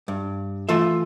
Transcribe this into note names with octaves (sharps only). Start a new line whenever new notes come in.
G2
E3 A3 F4 E5